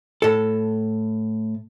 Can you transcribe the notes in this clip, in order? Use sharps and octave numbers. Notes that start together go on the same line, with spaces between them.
A2 A4